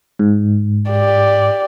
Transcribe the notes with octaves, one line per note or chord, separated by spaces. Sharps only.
G#2
G4 D5